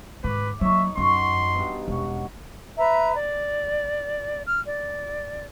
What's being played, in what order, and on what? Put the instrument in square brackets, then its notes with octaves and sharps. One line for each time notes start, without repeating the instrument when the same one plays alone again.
[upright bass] G#2 D#3 [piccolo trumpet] B4 [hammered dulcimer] D6
[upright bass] F#3 A#3 [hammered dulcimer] D#4 C#5 [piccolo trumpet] E5
[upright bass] F#2 [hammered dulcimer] F#4 C#6 [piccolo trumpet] C6
[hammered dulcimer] G2 B3
[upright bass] E1 [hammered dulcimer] C#4 F#5
[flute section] B4 E5 A#5
D5
F6
D5